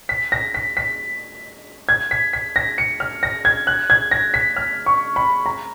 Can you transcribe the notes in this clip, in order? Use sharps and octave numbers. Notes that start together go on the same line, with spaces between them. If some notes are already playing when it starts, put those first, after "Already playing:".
B6
A#6
B6
B6
G#6
B6
B6
A#6
C#7
F6
A#6
G#6
F#6
G#6
A#6
B6
F6
C#6
B5
A#5